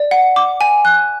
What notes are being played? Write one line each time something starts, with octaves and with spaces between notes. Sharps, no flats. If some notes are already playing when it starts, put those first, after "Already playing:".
Already playing: D5
F#5
D6
G#5
F#6